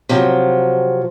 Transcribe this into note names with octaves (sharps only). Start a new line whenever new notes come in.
C3 F3 F#3